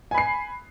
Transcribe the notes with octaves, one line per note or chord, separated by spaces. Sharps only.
G#5 B5 C7